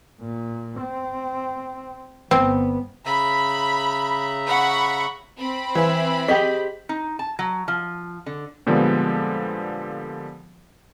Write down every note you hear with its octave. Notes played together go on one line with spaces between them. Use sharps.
A#2
C4
G1 B3 C4
C#3 E5 A#5 B5
F#5 B5 C#6
C4 B5
E3 E5
G4 G#4 D#5 B6
D#4
A5
F#3
F3
D3
A#2 D3 F3 G3 G#3 B3